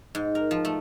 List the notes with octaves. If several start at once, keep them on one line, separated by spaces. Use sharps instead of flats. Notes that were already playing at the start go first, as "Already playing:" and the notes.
G#2
A#4
F3
A3